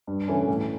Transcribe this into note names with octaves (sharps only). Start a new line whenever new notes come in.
G2
E3 A3 C#4
A2